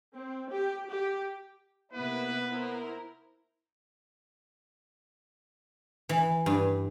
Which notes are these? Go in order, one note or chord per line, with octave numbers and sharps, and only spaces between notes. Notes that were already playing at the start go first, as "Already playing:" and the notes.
C4
G4
G4
C3 A#3 B3 E4 B4
E4 A#4 C5
E3
G2